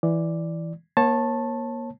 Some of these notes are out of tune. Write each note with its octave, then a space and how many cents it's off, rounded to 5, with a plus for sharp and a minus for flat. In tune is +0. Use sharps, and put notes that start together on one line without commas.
E3 +0 D5 +0
A#3 +30 C#5 -30 A5 +0